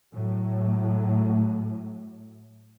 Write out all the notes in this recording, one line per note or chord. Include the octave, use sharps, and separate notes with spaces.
A2 F#3